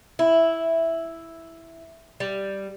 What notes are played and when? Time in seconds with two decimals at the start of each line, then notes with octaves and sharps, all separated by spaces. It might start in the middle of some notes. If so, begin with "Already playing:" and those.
0.19 E4
2.20 G3